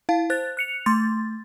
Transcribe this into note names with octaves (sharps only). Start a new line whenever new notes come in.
E4 F5 A5
C5 F#6 A6
F#6 C#7 F7
A3 C6 A6